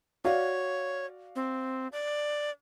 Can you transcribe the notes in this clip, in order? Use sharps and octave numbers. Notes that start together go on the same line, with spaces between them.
F#4 C#5 D5 F5
C4
D5